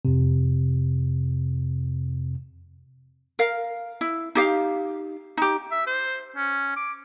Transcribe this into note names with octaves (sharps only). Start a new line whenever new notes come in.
F2 C3
A#4 F5
E4
D#4 G4 F5
D#4 G4
E5
C5
C#4
D6